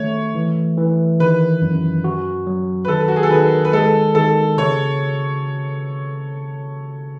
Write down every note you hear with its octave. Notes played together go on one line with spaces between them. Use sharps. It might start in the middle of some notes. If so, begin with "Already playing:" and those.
Already playing: D#3 A3 C#5
E3
E3
D#3 B4
F#2
F#4
F#3
B4
D#3 A4
F#4
G#4
A4
D#3 B4
B4
G#3 A4
D#3 A4
C#3 C#5